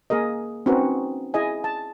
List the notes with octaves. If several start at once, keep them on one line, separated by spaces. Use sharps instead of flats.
A#3 G#4 A#4 D#5
C4 C#4 D#4 F#4 A#4 B4
E4 G#4 D#5 G#5
A5